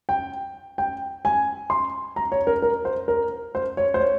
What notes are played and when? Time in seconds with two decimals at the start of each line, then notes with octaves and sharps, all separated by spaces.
0.09 G5
0.78 G5
1.25 G#5
1.70 C6
2.16 A#5
2.32 C#5
2.47 A#4
2.62 A#4
2.85 C5
3.08 A#4
3.55 C5
3.77 C#5
3.94 C5
4.00 C#5